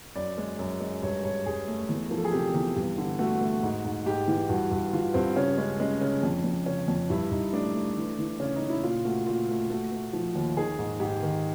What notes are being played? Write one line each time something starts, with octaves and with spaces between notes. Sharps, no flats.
F#2 D5
G#3
F#2
G#3
G2 C#5
G2 C#5
G2 G#4
A3
E2
F3 A#4
A4
G#4
C3 G4
E2
G2
D3
A3 F#4
A3
G#2
G#2
G#2 G4
E3
G2 F#4
G2
E3 F4
G2 C4
C#3 C#4
G#3 C#4
G#3 C#4
C#3
F2
F2
C#3 C#4
F2
G2 E4
G2 D#4
A3 D4
A3
E3
E3
C#3 C#4
D#4
C#3
E4
A#2 F4
A3 F#4
A#2 F4
A3
A3 F#4
A3
F3
D#2
D#3 G#4
G#2
G#2 G4
D#3